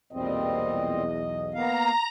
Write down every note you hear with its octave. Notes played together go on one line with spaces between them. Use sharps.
B1 E2 A#2 G3 C4 D#5
A#3 B3 F5 A#5